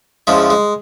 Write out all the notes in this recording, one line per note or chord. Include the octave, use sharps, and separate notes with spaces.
E2 C#3 F3 G#3
G#3